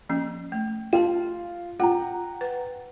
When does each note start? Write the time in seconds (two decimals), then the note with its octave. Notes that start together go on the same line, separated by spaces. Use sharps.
0.09 F3 A#3 C#4
0.52 A3
0.93 F4 G5 A5
1.80 F4 F#5 G5 A#5
2.41 B4